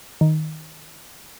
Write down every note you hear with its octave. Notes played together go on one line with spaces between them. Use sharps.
D#3